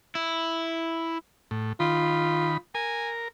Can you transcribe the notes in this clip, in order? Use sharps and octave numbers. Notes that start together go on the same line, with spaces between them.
E4
A2
D#3 F4 B5
A#4 G#5